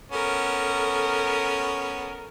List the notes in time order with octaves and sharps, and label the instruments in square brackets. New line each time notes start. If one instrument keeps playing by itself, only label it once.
[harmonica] B3 C#4 [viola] A4 A#4